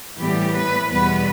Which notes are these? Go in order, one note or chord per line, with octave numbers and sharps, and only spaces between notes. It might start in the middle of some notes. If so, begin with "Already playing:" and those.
A2 E3 G3 B3 G4
B4
E2 B2 G3 B3 B4